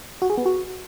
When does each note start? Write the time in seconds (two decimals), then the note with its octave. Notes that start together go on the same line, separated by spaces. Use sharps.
0.22 F#4
0.30 G#4
0.38 B3
0.46 F#4